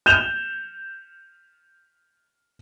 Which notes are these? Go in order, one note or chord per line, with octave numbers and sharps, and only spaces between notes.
G6 E7 F7